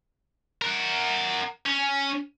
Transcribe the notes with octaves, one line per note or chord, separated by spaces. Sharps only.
A#4 F#5
C#4